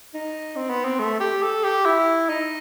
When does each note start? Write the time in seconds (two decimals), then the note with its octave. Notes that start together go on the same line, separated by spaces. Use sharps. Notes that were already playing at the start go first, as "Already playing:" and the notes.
0.14 D#4
0.56 C4
0.70 B3
0.84 C4
0.99 A3
1.20 G4
1.42 A4
1.64 G4
1.85 E4
2.29 D#4